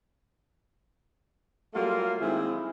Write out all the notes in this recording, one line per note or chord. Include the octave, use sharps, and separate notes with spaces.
F#3 G3 A3 A#3 F4 F#4
D#3 G#3 C4 E4